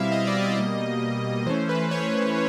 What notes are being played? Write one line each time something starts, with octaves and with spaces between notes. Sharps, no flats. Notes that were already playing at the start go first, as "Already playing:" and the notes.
Already playing: B2 G3 C4 E4 E5 F5
D#5
D5
D#5
B2 G3 A#3
E3 A3 C#4 C5
B4
C#5